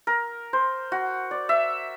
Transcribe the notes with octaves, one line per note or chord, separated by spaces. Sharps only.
A#4
C5
F#4
D5
E5